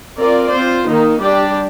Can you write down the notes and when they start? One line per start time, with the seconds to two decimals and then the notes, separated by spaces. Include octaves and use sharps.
0.18 C4 F4 A#4 D5
0.51 C4 F4 C5
0.86 D#3 A#3 D#4
1.20 G3 D4 G4 D5